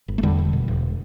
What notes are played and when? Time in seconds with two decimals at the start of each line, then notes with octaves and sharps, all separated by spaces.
0.08 G1
0.18 A3
0.23 E2 D3 G3
0.38 E1
0.53 B2
0.68 E1